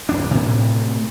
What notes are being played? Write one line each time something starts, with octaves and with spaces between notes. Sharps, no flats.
D1 F#2 D4
A2 C3